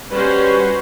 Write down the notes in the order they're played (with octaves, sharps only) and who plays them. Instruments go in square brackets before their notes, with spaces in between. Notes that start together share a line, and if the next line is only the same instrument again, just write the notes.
[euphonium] G3 [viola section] C#4 F#4 C5 [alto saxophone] B4